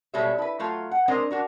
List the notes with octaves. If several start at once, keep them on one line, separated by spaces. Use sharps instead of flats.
B2 G3 G#3 A4 C#5 E5
E4 B4
F#3 A3 F4 F5
F#5
G#3 C4 D4 A#4 C5 D#5
D4 F#4 A#4